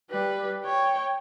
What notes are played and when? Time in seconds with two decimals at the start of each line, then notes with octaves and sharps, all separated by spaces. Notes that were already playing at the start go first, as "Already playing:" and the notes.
0.11 G3 B4
0.64 C#5 G5